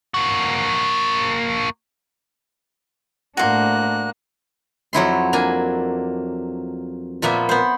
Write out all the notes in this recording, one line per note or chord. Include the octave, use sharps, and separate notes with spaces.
A#3 F#4
A2 A#3 D4 F#4 C5 F#6
F2 F#3 E4 C6
A#3 D4 G#5
A#2 F3 A#3 B3 E5
B3 C5